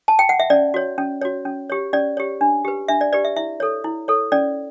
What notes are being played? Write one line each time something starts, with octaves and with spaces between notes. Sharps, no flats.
A5
G5
F#5
E5
C#4 D5
F#4 C#5
C#4
F#4 C#5
C#4
G4 C#5
C#4 D5
G4 C#5
D4
G4 B4
D4 E5
D5
G4 B4 D5
E5
E4 E5
A4 C#5
E4
A4 C#5
C#4 D5